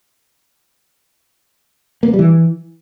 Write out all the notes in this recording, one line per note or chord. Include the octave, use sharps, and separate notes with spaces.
A#3
B3
G3
E3